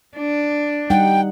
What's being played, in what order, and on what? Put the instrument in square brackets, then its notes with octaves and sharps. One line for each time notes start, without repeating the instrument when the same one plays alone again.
[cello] D4
[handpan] G3 D#4 F#5 [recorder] G5